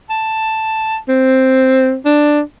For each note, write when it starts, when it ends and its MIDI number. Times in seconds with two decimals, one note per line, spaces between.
0.10 0.98 81
1.09 1.97 60
2.05 2.41 62